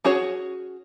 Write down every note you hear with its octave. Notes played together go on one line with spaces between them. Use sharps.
C#4 F#4 G#4 C#5